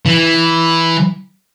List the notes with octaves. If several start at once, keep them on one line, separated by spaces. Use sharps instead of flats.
E3